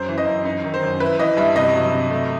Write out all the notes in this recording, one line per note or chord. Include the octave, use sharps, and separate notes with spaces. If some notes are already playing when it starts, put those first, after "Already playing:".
Already playing: F#2 C5
E3
D#5
F#2
D#4
D#3
C5
F#2
E4 B4
E3 D#5
G2 E5
C3 D#5
F#3
C3
A3